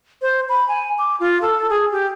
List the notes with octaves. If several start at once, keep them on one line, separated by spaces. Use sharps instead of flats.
C5
B5
G#5
D6
F4
A4
G#4
G4